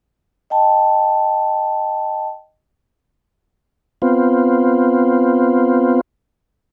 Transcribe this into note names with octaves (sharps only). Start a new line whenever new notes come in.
D#5 G5 A5
B3 C4 F4